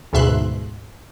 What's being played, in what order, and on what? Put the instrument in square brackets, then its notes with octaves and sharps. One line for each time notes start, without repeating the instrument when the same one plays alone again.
[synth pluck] D2 G#2 B2 E5 C6 F#6